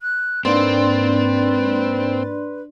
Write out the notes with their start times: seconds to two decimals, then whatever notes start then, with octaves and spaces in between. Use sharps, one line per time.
0.01 F#6
0.45 G#2 A#3 C4 D4 B4 D5 C6 A6